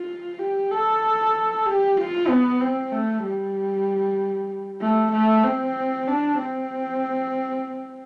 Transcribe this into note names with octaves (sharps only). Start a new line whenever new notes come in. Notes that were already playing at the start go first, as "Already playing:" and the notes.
Already playing: F4
G4
A4
G4
F4
B3
C4
A3
G3
A3
A3
C4
D4
C4